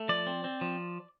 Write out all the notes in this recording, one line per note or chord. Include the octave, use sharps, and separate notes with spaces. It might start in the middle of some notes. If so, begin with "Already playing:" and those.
Already playing: A3
F3 D5
C4
C4
F3